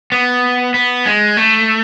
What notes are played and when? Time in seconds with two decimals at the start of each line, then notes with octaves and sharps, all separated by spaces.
0.12 B3
0.74 B3
1.06 G#3
1.37 A3